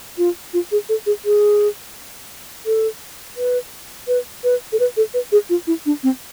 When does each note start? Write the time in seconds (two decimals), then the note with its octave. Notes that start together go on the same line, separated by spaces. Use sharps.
0.18 F4
0.53 F4
0.72 G#4
0.89 A4
1.06 G#4
1.25 G#4
2.66 A4
3.37 B4
4.08 B4
4.44 B4
4.72 A4
4.80 B4
4.97 A4
5.14 B4
5.32 G#4
5.50 F4
5.67 E4
5.86 D4
6.03 C4